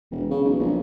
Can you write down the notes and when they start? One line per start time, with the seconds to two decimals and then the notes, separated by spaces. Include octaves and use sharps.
0.11 E1
0.31 C#3
0.44 B1
0.60 A#1